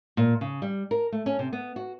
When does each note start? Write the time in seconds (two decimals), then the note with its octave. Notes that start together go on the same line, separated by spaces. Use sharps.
0.17 A#2
0.41 C#3
0.62 G3
0.91 A#4
1.12 A3
1.26 C#4
1.39 C3
1.53 B3
1.76 F#4